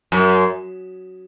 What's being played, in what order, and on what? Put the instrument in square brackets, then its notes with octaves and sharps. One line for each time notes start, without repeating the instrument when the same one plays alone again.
[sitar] F#2